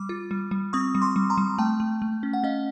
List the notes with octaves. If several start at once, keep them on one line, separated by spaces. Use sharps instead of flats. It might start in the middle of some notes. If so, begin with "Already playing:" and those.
Already playing: G3 D6
F4
G3
G3
C4 C#6 D#6
G3
C6 D6
G3
A#5 C6
G3
A3 G5 A5
A3
A3
C#4
F#5
C#4 D#5 F5